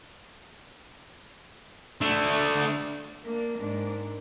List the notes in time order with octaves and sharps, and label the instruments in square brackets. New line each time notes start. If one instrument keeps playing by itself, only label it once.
[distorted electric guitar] A3 D4
[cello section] A#3 D4 [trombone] A#4
[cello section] G#2 D4